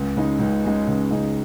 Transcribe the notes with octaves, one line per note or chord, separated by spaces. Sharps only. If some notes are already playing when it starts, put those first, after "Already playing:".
Already playing: C#2
C#3 G#3 D#4
C#2
C#3 G#3 D#4
C#2
C#3 G#3 D#4